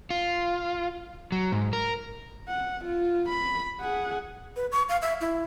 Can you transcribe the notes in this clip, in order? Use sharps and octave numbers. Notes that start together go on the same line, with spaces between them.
F4
F#3
G#2
A#4
F#5
F4
B5
G#4 F#5
B4
C#6
F5
E5
E4